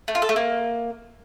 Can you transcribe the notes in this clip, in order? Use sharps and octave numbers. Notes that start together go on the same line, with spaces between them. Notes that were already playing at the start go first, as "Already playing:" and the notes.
A3
F4
A4
A3
A#3